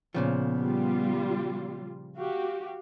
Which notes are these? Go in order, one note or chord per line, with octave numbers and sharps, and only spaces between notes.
A#2 C#3 F3 B3
G3 F4
F#4 G4 F5